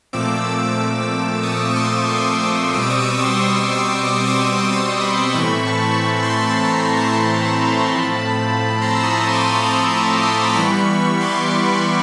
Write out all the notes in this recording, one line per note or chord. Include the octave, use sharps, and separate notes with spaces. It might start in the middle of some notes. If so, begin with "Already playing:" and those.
A#2 F3 A3 C4 D6 E6
C#6 D#6
C#6
C6 D6
C#6 D#6
B2 G3 C4 D6 E6
C#6 D#6
C#6 D#6
D#6
C6 D6
C6 D6
C#6 D#6
D6 E6
C#6 D#6
C#6 D#6
D#6
C6 D6
B5 C#6
A2 E3 A3 C4 B5 C#6
A5 B5
C6
B5 C#6
A#5 C6
A5 B5
A2 F3 A3 C4
A#5 C6
E6
C#6 D#6
D#6
D6
C#6 D#6
D6 E6
C#6 D#6
C6 D6
D6
E3 G3 B3 B5 C#6
C6 D6